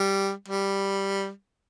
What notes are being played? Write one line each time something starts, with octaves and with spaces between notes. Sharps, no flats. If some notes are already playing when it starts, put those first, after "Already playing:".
Already playing: G3
G3